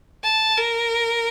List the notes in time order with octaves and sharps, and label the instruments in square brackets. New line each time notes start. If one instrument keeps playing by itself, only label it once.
[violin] A5
A#4